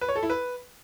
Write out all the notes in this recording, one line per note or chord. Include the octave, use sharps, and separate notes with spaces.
B4
C#5
A4
E4
B4